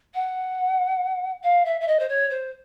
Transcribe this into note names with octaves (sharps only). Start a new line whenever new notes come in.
F#5
F5
E5
E5
D#5
C5
C#5
C5